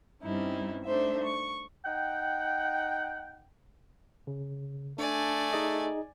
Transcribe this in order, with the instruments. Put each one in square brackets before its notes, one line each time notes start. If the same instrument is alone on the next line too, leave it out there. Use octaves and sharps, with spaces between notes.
[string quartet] G2 G3 C4 C#4 D#4 E4
A3 D4 D#4 C5 E5
C#6
[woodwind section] D#4 F#5 G5
[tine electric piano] C#3
[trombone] A3 [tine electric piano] D4 [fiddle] D5 G#5
[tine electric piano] D#4 G#4 D#5